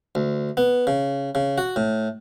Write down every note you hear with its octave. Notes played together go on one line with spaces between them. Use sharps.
D2
B3
C#3
C#3
F#4
A2